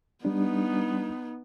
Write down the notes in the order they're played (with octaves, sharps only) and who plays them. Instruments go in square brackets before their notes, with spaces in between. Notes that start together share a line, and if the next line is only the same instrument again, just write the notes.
[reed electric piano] G3 D4 [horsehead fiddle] B3 D#4